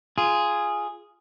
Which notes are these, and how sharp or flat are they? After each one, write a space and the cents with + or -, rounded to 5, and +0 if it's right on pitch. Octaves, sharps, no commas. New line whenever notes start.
F4 -10 G#4 +0